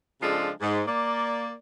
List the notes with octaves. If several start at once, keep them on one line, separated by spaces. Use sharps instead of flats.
C#3 F3 G#3 D4 F4 A4
G#2
A#3 D5